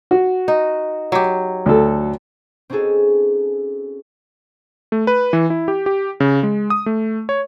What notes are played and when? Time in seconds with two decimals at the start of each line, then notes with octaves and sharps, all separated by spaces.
0.11 F#4
0.48 D#4
1.12 F#3 G4
1.66 D2 A4
2.70 C4 C#4 D#4 F#4 G#4 A4
4.92 A3
5.07 B4
5.33 E3
5.50 E4
5.68 G4
5.86 G4
6.20 C#3
6.43 G#3
6.70 D#6
6.86 A3
7.29 C#5